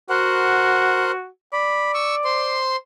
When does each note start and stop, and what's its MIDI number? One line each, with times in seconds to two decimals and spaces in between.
0.10 1.28 66
0.10 1.11 70
0.10 1.11 72
0.10 1.11 78
1.53 2.59 74
1.53 1.92 83
1.94 2.15 85
1.94 2.15 88
2.25 2.76 72
2.25 2.76 84